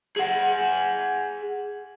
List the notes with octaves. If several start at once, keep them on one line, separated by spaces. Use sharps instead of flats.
G#4 F#5